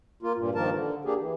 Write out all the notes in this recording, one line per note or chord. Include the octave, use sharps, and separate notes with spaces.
A#3 F4
G2 A#2
G2 D#3 F3 A#3 A#4 A5
D3
A#3 D4 G4 G#4
E3